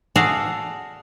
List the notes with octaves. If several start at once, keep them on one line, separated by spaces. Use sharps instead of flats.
F#4 G#4 A4 D5 D#5 F5